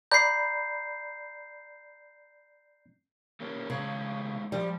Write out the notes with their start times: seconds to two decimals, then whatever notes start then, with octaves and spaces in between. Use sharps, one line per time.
0.11 D5 A#5 B5 G6 C7
3.40 G3 A#3 C#4
3.70 A2 C#3 G#3 F5
4.52 F3 G3